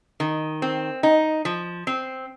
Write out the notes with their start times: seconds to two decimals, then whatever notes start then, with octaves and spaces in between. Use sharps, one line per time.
0.20 D#3
0.62 C4
1.03 D#4
1.45 F3
1.87 C4